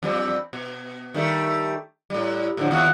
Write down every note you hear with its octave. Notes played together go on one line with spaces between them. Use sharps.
E2 G3 C4
B2
D#3 G3 A3
A2 G3
A2 D3 F3
D#2 F4 F#4